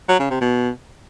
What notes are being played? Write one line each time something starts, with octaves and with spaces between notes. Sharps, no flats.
F#3
C#3
C3
B2